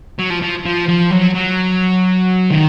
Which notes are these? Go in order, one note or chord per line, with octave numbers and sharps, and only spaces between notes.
F#3
F3
F3
F3
F3
F#3
F#3
D#3